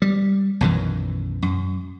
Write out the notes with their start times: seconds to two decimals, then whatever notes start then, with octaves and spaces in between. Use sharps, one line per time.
0.02 G3
0.61 B1 F#2 D#3 E3
1.42 F#2